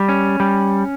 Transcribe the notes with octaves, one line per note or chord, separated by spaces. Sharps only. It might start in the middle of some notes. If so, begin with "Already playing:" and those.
Already playing: G3
C#4
G3